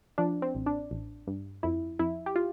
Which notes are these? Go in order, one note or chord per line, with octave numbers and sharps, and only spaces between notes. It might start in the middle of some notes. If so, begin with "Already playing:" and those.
F3 D4
C4
A1
D4
A1
G2
F2 E4
F2 E4
G4
F4